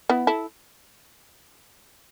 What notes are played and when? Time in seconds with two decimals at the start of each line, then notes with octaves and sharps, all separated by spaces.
0.09 B3 E4
0.27 E4 A4